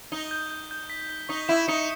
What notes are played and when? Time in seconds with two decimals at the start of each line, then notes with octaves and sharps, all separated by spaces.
0.12 D#4 G7
0.31 G6
0.51 G6
0.71 G6
0.90 B6
1.09 G7
1.29 D#4 C#6
1.48 E4 E7
1.68 D#4 C#7